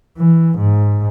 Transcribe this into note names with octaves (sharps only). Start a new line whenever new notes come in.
E3
G#2